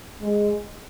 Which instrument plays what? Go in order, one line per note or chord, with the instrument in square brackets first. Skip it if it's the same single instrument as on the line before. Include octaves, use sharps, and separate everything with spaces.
[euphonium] G#3